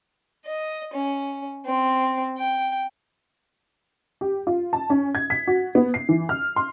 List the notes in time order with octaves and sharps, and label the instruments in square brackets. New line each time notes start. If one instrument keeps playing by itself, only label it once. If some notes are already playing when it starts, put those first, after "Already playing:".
[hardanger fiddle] D#5
C#4
C4
G5
[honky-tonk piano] G4
F4
A5
C#4
G#6
B6
F#4
B3
C7
E3
F6
C6